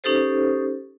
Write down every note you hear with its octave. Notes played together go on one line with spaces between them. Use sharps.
C#4 D#4 G4 A4 C5